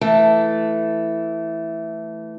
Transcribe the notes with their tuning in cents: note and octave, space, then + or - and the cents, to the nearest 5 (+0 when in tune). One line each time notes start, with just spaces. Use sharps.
E3 +0 A3 +0 A5 +0